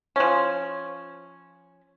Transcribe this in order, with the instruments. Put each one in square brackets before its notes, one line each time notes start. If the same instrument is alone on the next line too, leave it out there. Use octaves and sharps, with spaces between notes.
[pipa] F3 C#4